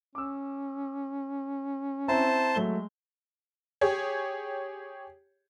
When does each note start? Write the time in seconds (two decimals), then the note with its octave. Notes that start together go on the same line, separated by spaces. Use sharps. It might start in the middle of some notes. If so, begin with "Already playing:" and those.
0.15 C#4 D6 E6
2.08 C4 E4 C5 A5 A#5
2.55 F#3 G#3 A3 G7
3.81 G4 G#4 C#5